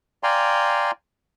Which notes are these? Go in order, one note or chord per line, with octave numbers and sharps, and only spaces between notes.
D5 F5 G5 G#5 A#5 C6